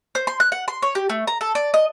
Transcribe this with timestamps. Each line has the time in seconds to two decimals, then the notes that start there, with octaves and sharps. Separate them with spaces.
0.15 C5
0.27 C6
0.40 F#6
0.52 F#5
0.68 C6
0.82 C#5
0.95 G4
1.10 A3
1.27 A#5
1.41 A4
1.55 D5
1.74 D#5